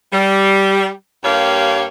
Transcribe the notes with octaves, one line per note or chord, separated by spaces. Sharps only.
G3
G2 A#3 G4 C#5 F5